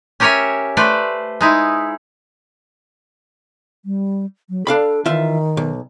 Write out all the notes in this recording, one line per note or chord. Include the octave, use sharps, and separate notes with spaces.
C#4 G4 A#4 C#5 E5 G#5
A3 B4 C5 D5
G#3 D#4 E4
G3
F#3
D4 A4 F5 B5
D#3 E3 F4 E5
B1